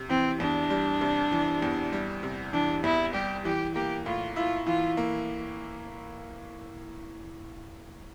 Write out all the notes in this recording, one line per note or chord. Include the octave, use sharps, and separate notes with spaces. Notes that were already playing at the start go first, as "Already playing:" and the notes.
Already playing: C3
E3 C4
E2 D4
G3
C3
E3
E2
G3
C3
E3 D4
E2 E4
G3 G4
E3 G4
A#3 G4
A2 F4
E4 F4
E3 F4
A#3